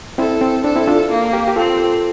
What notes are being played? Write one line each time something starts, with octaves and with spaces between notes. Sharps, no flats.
C4 E4 A4
C4
D4 A4
C4 E4
D4 F4
A#3
G4 A#4
G4
C4 F4 A4